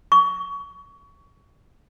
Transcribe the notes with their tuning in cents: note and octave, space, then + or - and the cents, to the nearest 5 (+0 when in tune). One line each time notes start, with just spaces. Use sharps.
C#6 +25